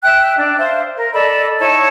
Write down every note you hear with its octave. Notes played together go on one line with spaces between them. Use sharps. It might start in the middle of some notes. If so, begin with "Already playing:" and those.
E5 G5 F#6
D4
C5 E5 F5
A#4
A4 D5 D#5 B5
D#4 E4 C#5 A5